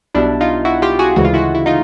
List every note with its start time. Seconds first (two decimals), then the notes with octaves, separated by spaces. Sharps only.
0.14 B1 B2 G3 D4 E4
0.41 D#4 F4
0.65 E4 F#4
0.82 F4 G4
0.99 F#4 G#4
1.16 D2 C#3 E3 G#3 F#4
1.25 F4
1.34 E4 F#4
1.55 E4
1.66 D#4 F4